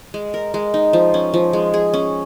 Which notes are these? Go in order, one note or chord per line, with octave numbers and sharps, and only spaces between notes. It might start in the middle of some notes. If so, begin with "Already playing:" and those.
G#3
A#4
G#3
D#4
F3
C#4
F3
G#3
G#4
C#4